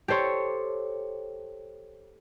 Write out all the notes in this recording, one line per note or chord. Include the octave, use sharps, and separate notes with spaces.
G4 A4 C5 C#5